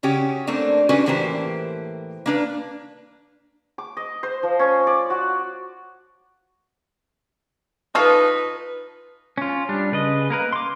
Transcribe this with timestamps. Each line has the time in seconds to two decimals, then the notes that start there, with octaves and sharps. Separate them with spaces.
0.03 C#3 C#4 F#4 G4
0.47 A3 A#3 C4 D4
0.89 C#4 D4 F#4 G4 B4
1.06 A2 E3 A#3 G4 C5 A5
2.26 A#3 D4 B4
3.78 D6
3.97 D#5
4.23 C5
4.43 F3
4.59 C#4
4.87 D5
5.10 F#4
7.95 D#4 F4 A4 B4 C#6 F6 C7
9.38 C#4 F4
9.69 G3 D4
9.92 C#3 B4 D#5
10.30 A#3 A#4 B4
10.53 C6 D6